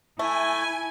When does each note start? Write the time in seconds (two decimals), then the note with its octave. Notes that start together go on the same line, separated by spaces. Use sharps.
0.19 A3 E4 G#5